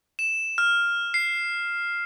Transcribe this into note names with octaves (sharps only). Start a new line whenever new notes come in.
E7
F6
C7